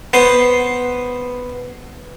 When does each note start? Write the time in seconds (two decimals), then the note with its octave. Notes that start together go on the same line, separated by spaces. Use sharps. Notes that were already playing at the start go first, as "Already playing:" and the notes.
0.13 B3 C5